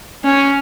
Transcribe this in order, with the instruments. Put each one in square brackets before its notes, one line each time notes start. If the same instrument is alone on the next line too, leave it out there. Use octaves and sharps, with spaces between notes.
[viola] C#4